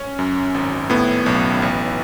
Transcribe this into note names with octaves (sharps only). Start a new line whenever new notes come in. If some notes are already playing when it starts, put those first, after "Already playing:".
Already playing: C#4
F#2
G#1
A2 B3
B1
A1